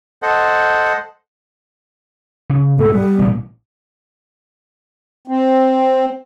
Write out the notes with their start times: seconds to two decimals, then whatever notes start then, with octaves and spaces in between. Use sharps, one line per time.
0.22 A4 C5 D#5 F#5
2.50 C#3
2.79 G#2 B2 A3 A4
2.93 G3 B3
3.19 A1 A#2
5.28 C4